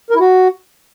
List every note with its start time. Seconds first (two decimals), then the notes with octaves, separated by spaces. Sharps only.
0.10 A#4
0.15 E4
0.20 F#4